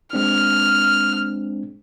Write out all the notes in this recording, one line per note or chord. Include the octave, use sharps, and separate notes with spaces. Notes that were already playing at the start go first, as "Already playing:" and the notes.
G#3 C4 D4 F6